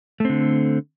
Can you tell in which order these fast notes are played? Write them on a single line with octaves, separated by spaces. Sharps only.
A3 C4 D3